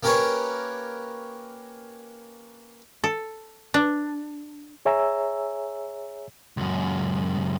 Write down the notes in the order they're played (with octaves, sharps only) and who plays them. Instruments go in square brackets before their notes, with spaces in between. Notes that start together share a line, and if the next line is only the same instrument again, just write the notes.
[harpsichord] A#3 C#4 G4 A#4 B4 C#5
[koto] A4
D4
[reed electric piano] G#4 C#5 E5 G#5 A#5 E6
[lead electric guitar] C#2 F#2